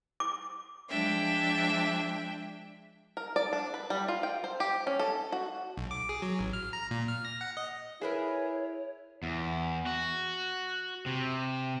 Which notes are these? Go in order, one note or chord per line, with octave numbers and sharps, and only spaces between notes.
D6
F3 G#3 D4 E5 G5
A#4
D5
D4
B4
G3
F4
G5
C5
G4
C#4
A4
F#4
B1
D6
G#4
F#3
A1
F6
A#5
A#2
F6
A#6
F#5
D#5
E4 G#4 A#4 B4 C#5 E5
E2
F#4
C3